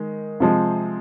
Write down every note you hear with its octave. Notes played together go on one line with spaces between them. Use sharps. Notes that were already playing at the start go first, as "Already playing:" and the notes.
Already playing: D#3 G#3
C3 F3 G#3